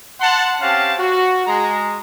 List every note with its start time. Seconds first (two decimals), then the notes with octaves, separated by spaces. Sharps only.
0.21 F#5 A5 C6
0.61 C4 C#4 G4 F5 F#5 A5
0.99 F#4
1.46 G#3 A#5